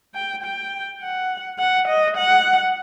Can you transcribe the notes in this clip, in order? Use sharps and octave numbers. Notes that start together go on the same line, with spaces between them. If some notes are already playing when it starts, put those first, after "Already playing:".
G5
G5
F#5
F#5
D#5
F#5